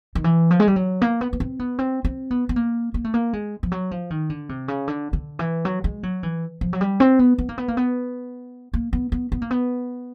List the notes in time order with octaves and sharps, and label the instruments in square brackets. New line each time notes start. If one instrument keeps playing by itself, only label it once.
[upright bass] D#3
E3
F3
G#3
G3
F#3
A#3
B3
B3
C4
B3
C4
C4
B3
B3
A#3
A#3
A3
A#3
G#3
F3
F#3
F3
D#3
D3
C3
C#3
D3
D3
E3
F#3
G#3
F#3
E3
F3
F#3
G3
C4
B3
B3
A#3
B3
A#3
B3
A#3
B3
B3
B3
A#3
B3